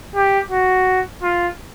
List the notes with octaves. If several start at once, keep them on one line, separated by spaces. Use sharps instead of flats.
G4
F#4
F4